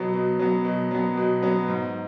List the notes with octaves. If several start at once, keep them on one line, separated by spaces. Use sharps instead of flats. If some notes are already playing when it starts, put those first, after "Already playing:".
Already playing: B2 F#3 B3
B2
F#3 B3
B2
F#3 B3
B2
F#3 B3
G#2